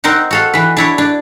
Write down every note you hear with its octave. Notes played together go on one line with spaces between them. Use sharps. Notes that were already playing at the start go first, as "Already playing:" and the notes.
C4 D#4 A#4 C5 F#5
F#4 A4 F5
E3 B4
D4 E4 C#5
D4